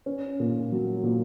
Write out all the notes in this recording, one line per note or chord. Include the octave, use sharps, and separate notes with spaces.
C#4
A#2
F#3
A#2